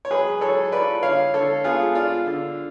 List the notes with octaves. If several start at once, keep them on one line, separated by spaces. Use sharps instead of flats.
C#5
F#3 G#4 B4
F#3 A4 C#5
F4 B4 D5
D3 C#5 F5
D3 A4 C#5
B3 F4 G#4
D4 F4
D3